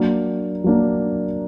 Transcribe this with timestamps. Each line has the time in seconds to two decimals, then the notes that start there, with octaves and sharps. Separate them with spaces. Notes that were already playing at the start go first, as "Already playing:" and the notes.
Already playing: F#3 A#3 D4
0.64 F#3 A#3 D4